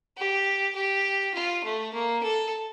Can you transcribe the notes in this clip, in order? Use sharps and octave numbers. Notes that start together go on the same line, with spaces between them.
G4
G4
F4
A3
A#3
A4